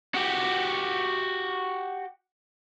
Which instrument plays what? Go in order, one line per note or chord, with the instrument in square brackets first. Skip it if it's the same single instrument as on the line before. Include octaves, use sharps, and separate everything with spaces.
[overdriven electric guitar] F#4 G4